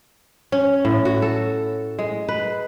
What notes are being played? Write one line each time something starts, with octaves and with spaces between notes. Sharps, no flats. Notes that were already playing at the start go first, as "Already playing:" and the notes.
C#4
A2
F#4
A4
G#3
B4